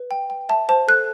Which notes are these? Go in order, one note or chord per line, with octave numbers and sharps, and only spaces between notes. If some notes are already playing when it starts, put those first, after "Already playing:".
Already playing: B4
G5
G5
E5 A5
C5 A5
A4 F#6